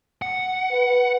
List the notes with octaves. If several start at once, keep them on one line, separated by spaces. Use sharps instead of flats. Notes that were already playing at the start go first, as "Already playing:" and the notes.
F#5
B4